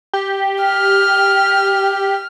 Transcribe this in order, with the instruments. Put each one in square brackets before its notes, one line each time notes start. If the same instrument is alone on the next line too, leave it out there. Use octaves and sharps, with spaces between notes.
[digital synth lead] G4
[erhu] F6